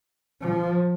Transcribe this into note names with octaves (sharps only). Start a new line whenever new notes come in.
F3